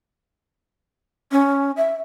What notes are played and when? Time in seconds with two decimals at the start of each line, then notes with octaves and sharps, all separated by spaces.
1.32 C#4
1.77 E5